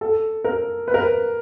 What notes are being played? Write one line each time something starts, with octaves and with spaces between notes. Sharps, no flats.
A4
A#4
B4
A#4
B4